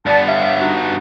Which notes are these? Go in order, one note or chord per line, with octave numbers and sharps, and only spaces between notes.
G2 B3 D5 A5
G4 C#5 E5 F5
D4 D#4 F#4